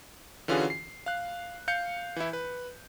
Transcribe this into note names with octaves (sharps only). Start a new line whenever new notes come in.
D3 E3 C#4 F4 F#4 G#4
C7
F5 F#6
F5 G6 C#7
E3 E4
B4